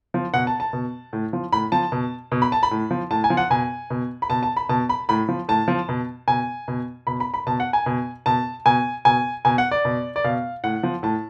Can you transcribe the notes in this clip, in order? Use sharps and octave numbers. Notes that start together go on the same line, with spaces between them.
F3
B2 F#5
A5
A5
B2
A2
F3
A2 B5
F3 A5
B2
B2
B5
A5
B5
A2
F3
A2 A5
G#5
F3
F#5
B2 G#5
B2
B5
B2 A5
A5
B5
B2 A5
B5
A2 B5
F3
A2 A5
F3
B2
B2 G#5
B2
B2 B5
B5
B5
B2 A5
F#5
G#5
B2
B2 A5
B2 G#5
B2 G#5
B2 G#5
F#5
D5
B2
D5
B2 F5
A2 F#5
F3
A2 A5